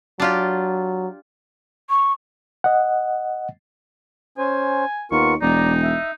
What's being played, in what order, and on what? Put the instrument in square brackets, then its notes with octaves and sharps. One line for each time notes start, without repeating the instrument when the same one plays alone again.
[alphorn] F#3 [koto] D4 F4 G4
[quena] C#6
[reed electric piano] D#5 F#5
[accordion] C#4 C5 [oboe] G#5
[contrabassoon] D#2 [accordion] B3 F4 A#4 [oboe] C#6
[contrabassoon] E1 [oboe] D#4 [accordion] D5 A#5
[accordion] E5